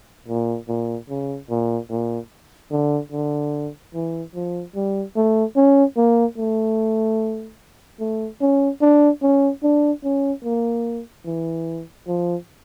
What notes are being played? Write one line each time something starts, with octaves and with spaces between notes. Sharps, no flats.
A#2
A#2
C#3
A#2
A#2
D3
D3
E3
F3
G3
A3
C#4
A#3
A3
A3
C#4
D4
C#4
D4
C#4
A#3
E3
F3